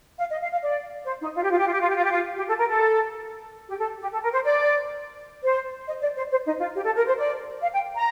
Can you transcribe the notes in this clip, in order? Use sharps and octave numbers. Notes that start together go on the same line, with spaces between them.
F5
D#5
F5
F5
D5
C5
D#4
F4
G4
F4
G4
F4
G4
F4
G4
F4
G4
F4
G4
A4
A#4
A4
G4
A4
G4
A4
A#4
C5
D5
C5
D#5
D5
C5
C5
D#4
F4
G4
A4
A#4
C5
D5
F5
G5
A#5